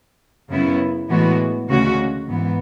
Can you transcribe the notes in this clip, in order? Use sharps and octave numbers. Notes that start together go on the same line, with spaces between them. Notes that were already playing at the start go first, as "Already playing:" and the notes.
F#2 C#3 F#3 B3 E4
A2 E3 G#3 B3 F#4
D2 C#3 G#3 C#4 F#4
G#2 E3 B3